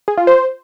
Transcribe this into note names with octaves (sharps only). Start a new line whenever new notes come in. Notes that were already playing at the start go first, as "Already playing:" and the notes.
G#4
F4
C5